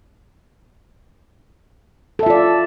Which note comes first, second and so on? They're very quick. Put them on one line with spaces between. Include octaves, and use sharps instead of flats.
A4 E5 F4 D5